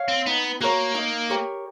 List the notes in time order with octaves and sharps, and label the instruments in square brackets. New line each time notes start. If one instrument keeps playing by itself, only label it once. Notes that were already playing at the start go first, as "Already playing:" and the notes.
Already playing: [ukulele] C#5 F5
[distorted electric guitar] C4
[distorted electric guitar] B3 [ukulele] D#4
[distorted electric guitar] A#3 [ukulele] F#4 A#4 C#5
[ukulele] D#4
G4 A#4 C#5